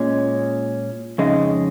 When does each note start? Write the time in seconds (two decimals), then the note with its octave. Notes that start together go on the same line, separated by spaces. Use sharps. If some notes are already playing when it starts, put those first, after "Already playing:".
Already playing: A#2 G#3 C#4
1.18 F2 C#3 G#3 D#4